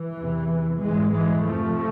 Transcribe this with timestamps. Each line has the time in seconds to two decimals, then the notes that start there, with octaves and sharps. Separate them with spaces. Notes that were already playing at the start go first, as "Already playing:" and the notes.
Already playing: E3
0.16 E2 C3
0.80 G#2 E3 G#3
1.12 E3 G#3
1.44 F2 C3 F3 A3